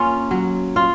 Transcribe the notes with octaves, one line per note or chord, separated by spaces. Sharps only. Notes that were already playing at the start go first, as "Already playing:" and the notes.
Already playing: A#3 C#4 F4
F#3
F4